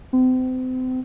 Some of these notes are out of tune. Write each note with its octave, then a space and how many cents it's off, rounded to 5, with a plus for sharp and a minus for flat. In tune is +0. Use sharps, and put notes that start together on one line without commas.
C4 -35